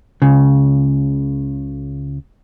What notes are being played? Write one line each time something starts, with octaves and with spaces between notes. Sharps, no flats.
C#2 C#3